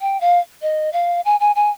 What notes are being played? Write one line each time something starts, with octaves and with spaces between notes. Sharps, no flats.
G5
F5
D#5
F5
G#5
G#5
G#5